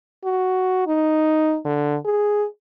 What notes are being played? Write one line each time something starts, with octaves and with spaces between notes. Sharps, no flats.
F#4
D#4
D3
G#4